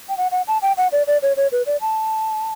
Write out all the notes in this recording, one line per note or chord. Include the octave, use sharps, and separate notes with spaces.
G5
F#5
F#5
A5
G5
F#5
D5
D5
C#5
C#5
B4
D5
A5